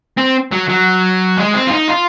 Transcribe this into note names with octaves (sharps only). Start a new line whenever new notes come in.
C4
F#3
F#3
G#3
C4
F4
D#4
F4